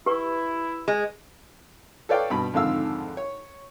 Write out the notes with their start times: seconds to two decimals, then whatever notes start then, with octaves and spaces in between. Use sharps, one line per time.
0.06 E4 G4 B4 C#6
0.88 G#3
2.09 A4 B4 C#5 D5 F5 G5
2.30 G2 B2 B5
2.53 F2 G#2 D3 D#3 F5 E6
3.17 C#5